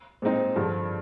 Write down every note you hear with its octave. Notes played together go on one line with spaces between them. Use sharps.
A#2 G#3 C4 D#4 C5
G2 D3 F3 G#4